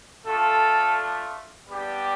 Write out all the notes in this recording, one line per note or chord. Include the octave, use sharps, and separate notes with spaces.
A3 D4 F4 A4
G3 B3 D4 G4